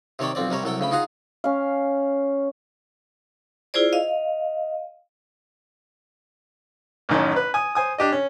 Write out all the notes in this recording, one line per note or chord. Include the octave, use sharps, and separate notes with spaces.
C3 D#3 C#5 D5 G5
B1 F2 C4 D5
C3 G3 A#4 C#5
C2 F#3 A4 G5
D2 C#3 G5 B5
D#4 F4 G#4 F#5 A#5
C#4 F5
E4 F4 G#4 C5 D5
D#5 F5
A1 F#2 D#3 C#4
B4
G#5 D#6
C5 G#5 D#6
D4 G4 D#5
C#4